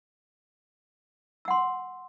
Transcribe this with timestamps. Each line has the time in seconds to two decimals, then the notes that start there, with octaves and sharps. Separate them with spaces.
1.45 E6
1.48 F#5
1.50 C6